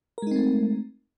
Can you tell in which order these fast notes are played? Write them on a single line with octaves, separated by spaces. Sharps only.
A#4 G#3 D#4 C4 A3